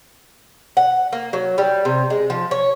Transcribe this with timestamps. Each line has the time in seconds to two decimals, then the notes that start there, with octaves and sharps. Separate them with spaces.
0.77 F#5
1.13 A#3
1.33 F#3
1.58 G3
1.85 C3
2.10 G#3
2.30 F3
2.51 C#5